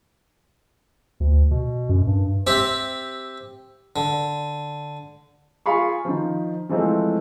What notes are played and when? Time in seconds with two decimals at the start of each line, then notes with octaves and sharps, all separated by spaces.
1.20 D2
1.51 B2
1.89 F#2
2.07 G2
2.47 C4 G4 E5 G5
3.96 D3
5.66 F4 G#4 F5 B5 C#6
6.05 D#3 F3
6.69 E3 F3 G#3 A3 C4